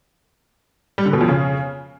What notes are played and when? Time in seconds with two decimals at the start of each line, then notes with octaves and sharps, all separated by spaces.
0.98 G3
1.06 D3
1.13 B2
1.21 F2
1.28 C#3